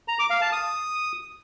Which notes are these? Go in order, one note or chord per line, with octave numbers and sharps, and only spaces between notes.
A#5
D6
F5
A5
D#6